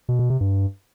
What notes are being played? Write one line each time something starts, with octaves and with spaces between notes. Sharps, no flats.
B2
B2
C3
G2